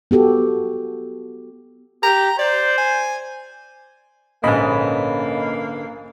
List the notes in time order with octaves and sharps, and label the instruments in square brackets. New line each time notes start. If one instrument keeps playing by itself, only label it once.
[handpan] B3 F#4 G4 A4
[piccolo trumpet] G4 [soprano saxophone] A#5
[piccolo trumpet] C5 [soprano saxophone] D5
[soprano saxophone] G#5
[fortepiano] A#1 G#2 [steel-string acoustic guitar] D3 B3 C#4 [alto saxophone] A#3 [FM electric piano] D#5 B5